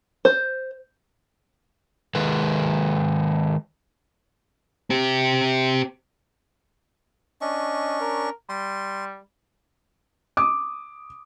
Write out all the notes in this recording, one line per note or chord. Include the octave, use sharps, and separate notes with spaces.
C5
D#3 G#3 B4
C4 G4
C#4 D4 D#5 C#6
A#4
G3 C6
D6 D#6